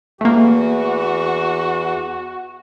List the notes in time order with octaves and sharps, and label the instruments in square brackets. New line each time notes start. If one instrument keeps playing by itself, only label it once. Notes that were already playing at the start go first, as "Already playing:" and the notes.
[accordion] E2 E3 [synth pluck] A3 A#3 [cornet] F#4